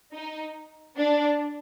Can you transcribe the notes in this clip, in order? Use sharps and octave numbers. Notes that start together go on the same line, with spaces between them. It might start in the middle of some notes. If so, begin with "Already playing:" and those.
D#4
D4